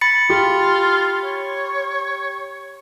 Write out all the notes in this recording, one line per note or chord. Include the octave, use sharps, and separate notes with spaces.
B5 A6 C#7
F4 G4
C#5